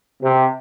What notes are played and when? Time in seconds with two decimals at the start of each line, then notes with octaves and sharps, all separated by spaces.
0.23 C3